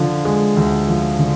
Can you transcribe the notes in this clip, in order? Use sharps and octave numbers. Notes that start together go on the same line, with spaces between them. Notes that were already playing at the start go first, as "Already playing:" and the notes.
Already playing: D3 F3
G#3
D2
F3
D3